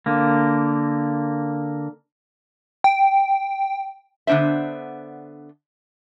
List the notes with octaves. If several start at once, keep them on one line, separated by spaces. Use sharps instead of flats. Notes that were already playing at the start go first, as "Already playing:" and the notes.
D3 A#3
G5
D3 B3 D4 C5 E5